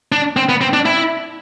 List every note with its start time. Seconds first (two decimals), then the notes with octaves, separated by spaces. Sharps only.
0.12 D4
0.37 C4
0.49 B3
0.61 C4
0.73 D4
0.86 E4